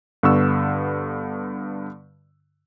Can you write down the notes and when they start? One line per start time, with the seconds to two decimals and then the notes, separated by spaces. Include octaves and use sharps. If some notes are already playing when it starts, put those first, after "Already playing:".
0.23 G2 D3 B3 C#6 E6